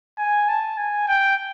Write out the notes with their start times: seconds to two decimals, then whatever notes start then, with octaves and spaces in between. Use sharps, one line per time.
0.18 G#5
0.49 A5
0.78 G#5
1.08 G5